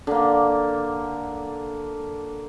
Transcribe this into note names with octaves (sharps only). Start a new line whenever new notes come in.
D3 A#3